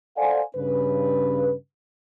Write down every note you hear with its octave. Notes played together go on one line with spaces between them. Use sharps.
A4 C5 D5 F5 F#5 G#5
G2 C#3 B4